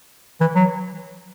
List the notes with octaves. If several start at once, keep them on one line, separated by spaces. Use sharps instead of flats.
E3
F#3